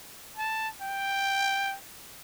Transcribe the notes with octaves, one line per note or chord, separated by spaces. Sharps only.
A5
G5